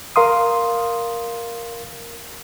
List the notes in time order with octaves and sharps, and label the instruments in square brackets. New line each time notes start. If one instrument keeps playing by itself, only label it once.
[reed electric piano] A#4 F5 C6 D#6